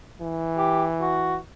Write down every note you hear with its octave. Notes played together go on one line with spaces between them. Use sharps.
E3
G4
F#4